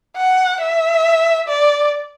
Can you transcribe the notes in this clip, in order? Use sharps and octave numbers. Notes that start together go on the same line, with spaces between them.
F#5
E5
D5